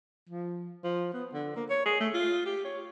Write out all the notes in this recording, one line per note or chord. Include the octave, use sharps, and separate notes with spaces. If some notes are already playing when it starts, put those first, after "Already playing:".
F3
F3
B3
D3
A#3
C#5
G#4
A3
F4
G4
C#5